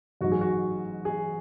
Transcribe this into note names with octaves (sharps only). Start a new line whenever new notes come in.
A1 G#2 F#3 F#4
G#4
F#4
G#4